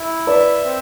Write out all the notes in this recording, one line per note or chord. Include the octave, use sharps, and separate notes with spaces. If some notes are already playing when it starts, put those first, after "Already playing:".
Already playing: E4
B4 D5 E5
C4